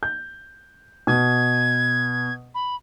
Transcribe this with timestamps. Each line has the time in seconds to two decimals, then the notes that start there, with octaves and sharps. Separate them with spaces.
0.03 G6
1.07 B2 G#6
2.54 B5